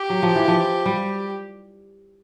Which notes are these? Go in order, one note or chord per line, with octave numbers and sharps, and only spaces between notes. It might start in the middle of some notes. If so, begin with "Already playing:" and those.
Already playing: G4
F#3
F3
E3
F3
G3